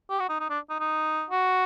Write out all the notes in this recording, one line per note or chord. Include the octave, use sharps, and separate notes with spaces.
G4
F#4
D#4
D#4
D4
D#4
D#4
F#4